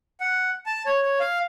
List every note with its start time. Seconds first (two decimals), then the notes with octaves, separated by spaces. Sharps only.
0.20 F#5
0.66 A5
0.86 C#5
1.03 C#5
1.20 F5